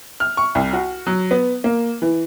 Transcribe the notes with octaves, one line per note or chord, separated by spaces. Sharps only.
F6
C#6
C2
F#4
F#3
B3
A#3
E3